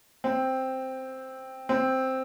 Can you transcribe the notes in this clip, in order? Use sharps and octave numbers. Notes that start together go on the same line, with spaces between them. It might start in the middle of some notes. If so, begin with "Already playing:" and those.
C4
C4